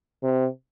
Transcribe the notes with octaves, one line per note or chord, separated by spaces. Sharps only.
C3